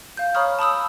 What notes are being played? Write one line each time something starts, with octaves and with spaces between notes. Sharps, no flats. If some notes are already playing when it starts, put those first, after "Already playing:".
F5 G6
C#5 A#5 B5 C#6 D#6 F6
A5 B5 D#6 E6